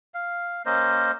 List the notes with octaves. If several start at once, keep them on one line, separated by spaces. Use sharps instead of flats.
F5
A#3 C#4 C5 D#5